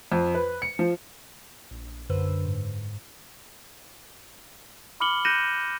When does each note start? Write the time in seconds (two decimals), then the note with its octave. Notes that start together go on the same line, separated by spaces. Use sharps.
0.12 F2
0.35 B4
0.62 C#7
0.79 F3
1.71 A#1
2.09 F#2 D3 B4 C5 E6
2.46 G#2
5.00 B5 D6 F6 C#7 F#7 G7
5.25 F#6 G6 A#6 C#7 D#7 E7